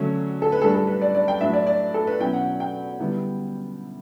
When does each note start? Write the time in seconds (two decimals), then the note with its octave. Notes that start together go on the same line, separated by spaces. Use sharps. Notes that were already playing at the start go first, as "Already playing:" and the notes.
Already playing: D3 F#3 A3 C#4
0.42 A4
0.52 B4
0.62 A2 G3 D4 A4
0.74 A4
0.87 B4
1.02 D5
1.15 D5
1.28 G5
1.41 A2 F#3 A3 D4 E5
1.53 D5
1.67 D5
1.94 A4
2.07 B4
2.20 B2 F#3 C#4 E4 G5
2.33 F#5
2.60 G5
2.99 D3 G3 B3 E4